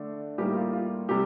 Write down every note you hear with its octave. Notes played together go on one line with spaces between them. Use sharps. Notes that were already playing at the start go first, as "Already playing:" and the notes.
Already playing: D3 A3 D4
A2 G3 A#3 D#4 G4
F4
F4
C3 G3 G4